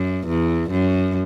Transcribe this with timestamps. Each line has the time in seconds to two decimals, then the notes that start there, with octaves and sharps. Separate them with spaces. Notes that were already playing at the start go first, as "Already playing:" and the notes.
Already playing: F#2
0.27 E2
0.71 F#2